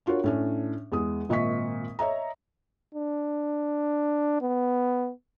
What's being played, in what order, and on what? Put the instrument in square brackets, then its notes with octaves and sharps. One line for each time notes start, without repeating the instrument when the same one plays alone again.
[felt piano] D4 F4 F#4 A#4 C#5
A2 C#4 D4
E2 G#3 D#6
G#1 A#2 D#5 E5 C#6 B6
C#5 D#5 E5 A#5
[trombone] D4
B3